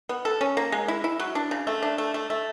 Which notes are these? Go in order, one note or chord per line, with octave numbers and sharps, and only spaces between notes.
B3
A4
C#4
A#3
G#3
E4
E4
F#3
D4
C#3
A3
D4
A3
A3
A3